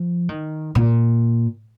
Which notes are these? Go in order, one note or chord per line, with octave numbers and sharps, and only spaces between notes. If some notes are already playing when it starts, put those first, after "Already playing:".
Already playing: F3
D#3
A#2